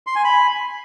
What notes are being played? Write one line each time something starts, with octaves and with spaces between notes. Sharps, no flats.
C6
G#5
B5